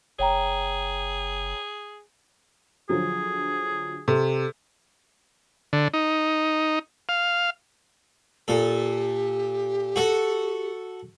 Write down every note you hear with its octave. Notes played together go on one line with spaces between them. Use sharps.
F#1 G#4 C#5 G5 A#5
D3 F3 F#3 G#4
C3 A4
D3
D#4
F5
A#2 G4 A4
F#4 A4 F#5